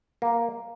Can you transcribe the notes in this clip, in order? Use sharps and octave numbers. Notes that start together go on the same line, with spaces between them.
A#3